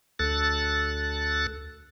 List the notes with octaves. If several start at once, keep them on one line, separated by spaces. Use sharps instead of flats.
D2 A4 F#6 A6